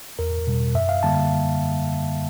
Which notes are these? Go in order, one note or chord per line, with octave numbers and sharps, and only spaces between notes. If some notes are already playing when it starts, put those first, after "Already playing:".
E2 A#4
B2 G3
F#2 E5
F5
D3 G3 A#3 A5